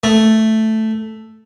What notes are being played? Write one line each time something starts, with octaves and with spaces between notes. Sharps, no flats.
A3